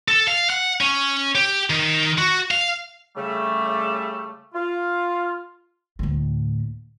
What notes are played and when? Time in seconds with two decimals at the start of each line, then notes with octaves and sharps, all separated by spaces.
0.08 A4
0.27 F5
0.50 F#5
0.81 C#4
1.35 G4
1.70 D#3
2.18 F#4
2.51 F5
3.16 C#3 G3 A3
4.55 F4
5.99 D2 A2